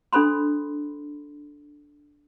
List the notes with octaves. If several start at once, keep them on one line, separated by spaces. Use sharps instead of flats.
D4 A4 C5 B5 C6